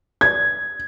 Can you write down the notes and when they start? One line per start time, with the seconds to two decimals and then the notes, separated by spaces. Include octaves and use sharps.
0.21 G#6